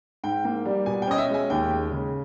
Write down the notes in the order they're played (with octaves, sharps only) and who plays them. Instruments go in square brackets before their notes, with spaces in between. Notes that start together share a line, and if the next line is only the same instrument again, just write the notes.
[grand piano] G#2 G5
A#3
G3
B2 G#5
G5
C#4 D#5
E5
G#3
G#5
D#2 G5
G#3
C#3